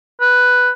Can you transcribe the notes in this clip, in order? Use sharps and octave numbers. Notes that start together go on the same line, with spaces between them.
B4